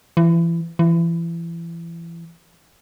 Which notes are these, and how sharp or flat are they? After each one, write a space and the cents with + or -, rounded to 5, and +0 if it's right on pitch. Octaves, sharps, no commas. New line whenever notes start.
E3 +30
E3 +30